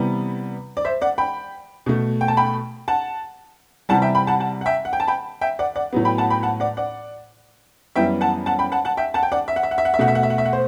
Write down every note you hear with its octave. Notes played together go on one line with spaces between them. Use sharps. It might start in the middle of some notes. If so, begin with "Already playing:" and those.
Already playing: C3 E3 G3 B3
D5
C5 E5
D5 F#5
G5 B5
B2 A3
G5
A5
G5 B5
F#5 A5
C3 E3 G3 F#5 A5
E5 G5
G5 B5
F#5 A5
F#5 A5
F#5
E5 G5
F#5
G5
A5
G5 B5
E5 G5
D5 F#5
D5 F#5
A2 F#3 B3
G5 B5
F#5 A5
G5 B5
F#5 A5
D5 F#5
D5 F#5
F#2 E3 G3 B3 E5 G5
F#5 A5
F#5 A5
G5 B5
F#5 A5
F#5 A5
E5 G5
F#5 A5
G5
D5 F#5
E5
F#5
E5
F#5
E5
F#5
E5
B2 A3 F#5
E5
F#5
E5
F#5
E5
F#5
C5